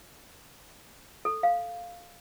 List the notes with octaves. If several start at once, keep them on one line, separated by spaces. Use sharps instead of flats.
A4
F5